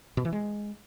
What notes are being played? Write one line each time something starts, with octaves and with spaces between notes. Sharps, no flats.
B2
E3
G#3